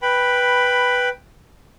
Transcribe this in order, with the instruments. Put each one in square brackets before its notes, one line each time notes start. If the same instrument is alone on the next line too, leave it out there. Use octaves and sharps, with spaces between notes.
[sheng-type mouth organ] B4 G5 B5